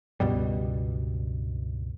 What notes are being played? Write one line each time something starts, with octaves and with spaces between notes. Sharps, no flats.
C#2 G2 B2 G3